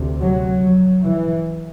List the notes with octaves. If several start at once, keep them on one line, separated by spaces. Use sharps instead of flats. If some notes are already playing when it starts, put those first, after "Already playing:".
Already playing: D2 C3
F#3
F#3
E3